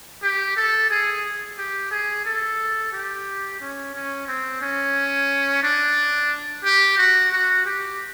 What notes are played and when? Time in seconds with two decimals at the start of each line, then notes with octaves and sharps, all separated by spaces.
0.23 G4
0.56 A4
0.90 G#4
1.58 G4
1.91 G#4
2.25 A4
2.93 G4
3.60 C#4
3.94 C#4
4.28 C4
4.62 C#4
5.63 D4
6.64 G4
6.98 F#4
7.32 F#4
7.65 G4